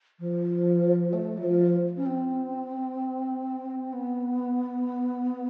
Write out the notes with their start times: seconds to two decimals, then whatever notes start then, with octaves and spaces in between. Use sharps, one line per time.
0.19 F3
1.12 A3
1.37 F#3
1.43 F3
1.96 C#4
2.05 C4
3.92 B3